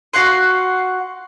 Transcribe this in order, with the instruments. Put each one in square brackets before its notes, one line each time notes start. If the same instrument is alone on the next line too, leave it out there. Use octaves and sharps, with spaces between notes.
[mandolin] F#4 F5 F#5 C6